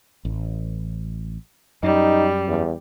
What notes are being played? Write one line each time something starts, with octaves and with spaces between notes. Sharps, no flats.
A1
F#2 G3 D#4
E2